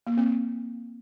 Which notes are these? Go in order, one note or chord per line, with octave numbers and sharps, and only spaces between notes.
A#3
C4